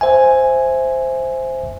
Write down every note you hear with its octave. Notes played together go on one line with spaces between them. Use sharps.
C5 E5 G#5